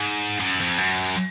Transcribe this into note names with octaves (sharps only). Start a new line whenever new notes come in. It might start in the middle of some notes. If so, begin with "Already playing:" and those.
Already playing: G#2
F#2
F2
F#2